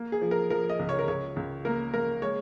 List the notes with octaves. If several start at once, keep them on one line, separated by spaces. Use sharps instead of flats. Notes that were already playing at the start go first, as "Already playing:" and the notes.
Already playing: A#3
G#4
F3
A#4
F3 A#4
D#5
C#2
C#5
A#4
C#2 C#5
C#2
A#3 A#4
A#3 A#4
G#3 C#5